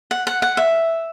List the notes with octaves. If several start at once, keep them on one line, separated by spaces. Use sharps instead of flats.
F#5
F#5
F#5
E5